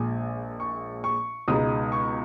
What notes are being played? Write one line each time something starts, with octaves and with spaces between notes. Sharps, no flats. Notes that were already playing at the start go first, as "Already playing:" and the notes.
Already playing: A#1 A#2 G#3 G#5
C#6
C#6
C#2 B2 G#3 D#4 D#6
C#6